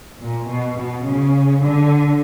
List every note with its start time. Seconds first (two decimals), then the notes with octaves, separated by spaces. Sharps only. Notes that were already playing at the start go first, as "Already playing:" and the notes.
0.22 A#2
0.50 B2
0.77 B2
1.06 C#3
1.62 D3